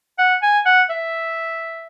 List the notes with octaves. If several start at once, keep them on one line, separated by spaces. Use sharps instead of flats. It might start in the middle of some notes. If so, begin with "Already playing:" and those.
F#5
G#5
F#5
E5